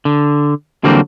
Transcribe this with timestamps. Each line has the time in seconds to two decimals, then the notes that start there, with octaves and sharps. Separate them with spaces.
0.05 D3
0.84 D3 E3 F#3 G3 A#3 C4